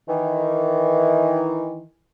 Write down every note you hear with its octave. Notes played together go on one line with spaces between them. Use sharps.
D#3 E3